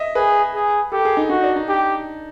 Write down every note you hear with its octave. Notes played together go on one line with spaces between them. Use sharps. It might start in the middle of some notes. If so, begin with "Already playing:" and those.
Already playing: D#5 E5
G#4 B4
G#4
G4 A4
G#4
D#4
D#4 F#4
D4
D#4
G4